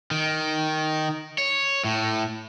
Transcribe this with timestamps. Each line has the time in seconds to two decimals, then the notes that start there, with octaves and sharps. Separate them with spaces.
0.11 D#3
1.38 C#5
1.84 A2